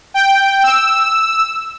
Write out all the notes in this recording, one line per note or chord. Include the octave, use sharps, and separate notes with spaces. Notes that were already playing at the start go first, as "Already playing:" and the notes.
G5
E6